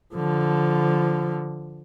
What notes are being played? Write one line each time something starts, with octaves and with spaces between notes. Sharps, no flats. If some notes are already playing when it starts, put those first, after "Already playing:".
D3 F3